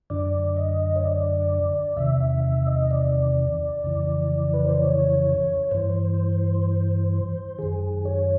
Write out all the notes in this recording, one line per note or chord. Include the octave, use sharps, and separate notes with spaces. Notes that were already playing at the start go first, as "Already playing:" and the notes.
F#2 D3 D5
D#5
C#5
D5
E2 C3 D#3 E5
E5
E5
D#5
D5
F2 C#3 E3
B4
C5
C#5
G2 E3 C5
F#2 D#3 G#4
C#5